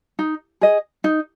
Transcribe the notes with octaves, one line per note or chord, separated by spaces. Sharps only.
D#4
G#4 D#5
D#4